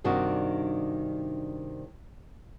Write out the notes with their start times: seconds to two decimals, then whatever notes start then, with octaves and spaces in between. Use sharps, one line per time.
0.04 G2 C3 D#3 D4 D#4 F#4